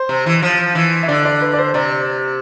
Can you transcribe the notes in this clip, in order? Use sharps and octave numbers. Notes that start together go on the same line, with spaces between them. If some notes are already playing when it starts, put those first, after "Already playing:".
Already playing: C5
C3
E3
F3
E3
E5
D3 D5
D5
B4
D5
C5
C3 D5